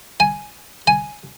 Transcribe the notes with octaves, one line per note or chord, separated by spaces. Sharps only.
G#5
G#5